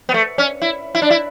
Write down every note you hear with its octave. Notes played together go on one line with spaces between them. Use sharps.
B3
A3
C#4
E4
E4
D4
E4